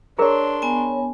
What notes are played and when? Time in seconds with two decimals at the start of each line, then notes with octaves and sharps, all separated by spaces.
0.19 D4 G#4 A#4 C#5 A#5 C6
0.62 B3 G#5